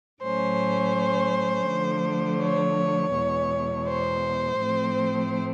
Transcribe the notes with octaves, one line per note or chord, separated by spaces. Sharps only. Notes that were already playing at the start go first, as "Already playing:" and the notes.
A2 F#3 A3 C#4 C5
D3 F3 A3
C#5
E2 B2 G#3
C5
A2 F3 A3 C4